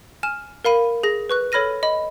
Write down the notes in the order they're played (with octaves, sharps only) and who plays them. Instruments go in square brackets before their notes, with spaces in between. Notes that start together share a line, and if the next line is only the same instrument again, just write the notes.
[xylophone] G#5 F6 E7
A#4 F5 B5 D#7
G#4 A#6
B4 C#6 F#6
A4 C#5 B5 F6 A#6 D#7
D#5 B5